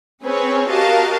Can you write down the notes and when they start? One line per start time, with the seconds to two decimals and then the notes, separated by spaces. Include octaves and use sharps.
0.25 C4 C#4 G#4 B4 C#5
0.69 F#4 G4 A#4 D#5 F5 A5